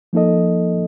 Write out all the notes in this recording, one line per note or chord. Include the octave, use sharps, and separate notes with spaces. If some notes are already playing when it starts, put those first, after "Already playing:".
F3 A#3 D#4 A4 D#5